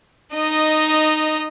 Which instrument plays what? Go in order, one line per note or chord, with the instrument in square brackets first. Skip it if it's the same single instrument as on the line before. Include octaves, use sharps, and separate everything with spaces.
[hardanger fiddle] D#4 D#5